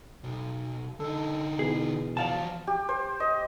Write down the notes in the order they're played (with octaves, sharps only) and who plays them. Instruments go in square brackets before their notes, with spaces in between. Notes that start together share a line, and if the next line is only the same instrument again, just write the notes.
[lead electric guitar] B1
[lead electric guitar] D3 D#4 [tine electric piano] A4
[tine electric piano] B2 E3 [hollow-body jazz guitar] G#4
[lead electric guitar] F3 F#4 [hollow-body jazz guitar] D5 F5 A5
[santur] G4
C5
D#5